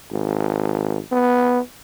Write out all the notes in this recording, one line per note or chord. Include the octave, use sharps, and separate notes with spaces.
G#1
B3